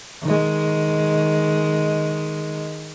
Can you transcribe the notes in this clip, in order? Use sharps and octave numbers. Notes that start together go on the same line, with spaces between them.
D#3 G#3